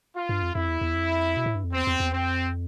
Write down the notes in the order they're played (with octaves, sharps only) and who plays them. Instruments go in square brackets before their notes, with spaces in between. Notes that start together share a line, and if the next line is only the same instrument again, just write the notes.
[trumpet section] F4
[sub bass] G2
F2
[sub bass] F2 [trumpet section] E4
[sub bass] E2
E2
F2
B2
A2
G2
F2
[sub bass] E2 [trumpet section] C4
[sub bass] E2
E2
[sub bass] F2 [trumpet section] C4